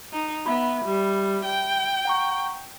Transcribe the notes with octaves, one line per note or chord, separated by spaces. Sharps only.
D#4
B3 E5 B5
G3
G5
F#5 A#5 C#6